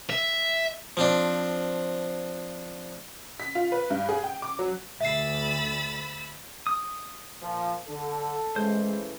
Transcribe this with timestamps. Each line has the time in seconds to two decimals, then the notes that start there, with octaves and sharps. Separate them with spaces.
0.10 E5
0.97 F3 C4 D4
3.40 B6
3.55 F4
3.72 B4
3.90 G2
4.09 G#4
4.24 G5
4.42 D6
4.59 F#3
5.01 D2 E5 B5 E6 A6 C7
6.67 D#6
7.41 A#2 F3
7.87 D3 A4
8.56 A2 C#3 E3 G#3 C5